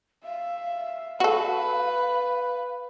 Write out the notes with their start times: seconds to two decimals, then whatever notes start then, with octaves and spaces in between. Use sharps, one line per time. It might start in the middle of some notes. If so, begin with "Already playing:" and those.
0.24 E5 F5
1.20 F#4 A4 B4